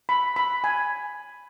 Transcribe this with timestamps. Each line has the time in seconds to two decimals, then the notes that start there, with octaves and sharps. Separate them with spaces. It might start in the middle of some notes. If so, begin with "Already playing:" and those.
0.09 B5
0.36 B5
0.64 G#5